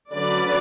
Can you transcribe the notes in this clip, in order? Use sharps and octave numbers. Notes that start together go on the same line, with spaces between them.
D3 F#3 C#4 B4 D5